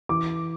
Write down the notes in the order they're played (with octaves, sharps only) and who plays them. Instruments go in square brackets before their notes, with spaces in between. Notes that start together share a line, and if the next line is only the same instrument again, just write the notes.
[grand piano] E3 D6